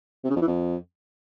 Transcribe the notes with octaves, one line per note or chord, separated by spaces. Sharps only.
C3
C#3
F2
E3
F2